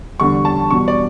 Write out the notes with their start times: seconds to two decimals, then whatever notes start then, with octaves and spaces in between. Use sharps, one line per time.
0.20 E2 D3 G3 C#6
0.45 A5
0.71 E2 B2 G3 C#6
0.88 D5